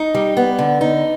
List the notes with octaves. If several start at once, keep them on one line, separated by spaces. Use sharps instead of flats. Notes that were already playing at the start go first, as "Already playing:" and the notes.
Already playing: D#4
G3
B3
D3
D#4